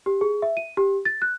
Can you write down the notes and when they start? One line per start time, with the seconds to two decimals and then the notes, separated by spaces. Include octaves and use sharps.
0.06 G4
0.21 G#4
0.42 E5
0.57 D#7
0.77 G4
1.05 A6
1.22 F#6